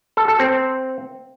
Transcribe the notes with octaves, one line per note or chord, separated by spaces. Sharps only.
A4
A4
C4